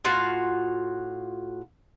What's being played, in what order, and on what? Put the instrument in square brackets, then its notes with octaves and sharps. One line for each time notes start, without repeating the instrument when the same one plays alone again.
[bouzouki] A2 F4 F#4 F5